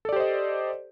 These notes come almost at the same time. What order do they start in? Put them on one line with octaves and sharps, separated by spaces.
A4 D5 G4 C5 D#5